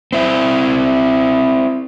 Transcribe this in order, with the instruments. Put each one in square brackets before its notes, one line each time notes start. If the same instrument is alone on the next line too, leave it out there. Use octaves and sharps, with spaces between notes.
[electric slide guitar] C4 E4